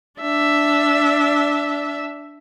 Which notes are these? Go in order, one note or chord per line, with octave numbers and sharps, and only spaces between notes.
D4 E5